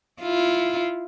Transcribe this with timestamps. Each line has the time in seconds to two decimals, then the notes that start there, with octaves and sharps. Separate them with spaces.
0.21 E4 F4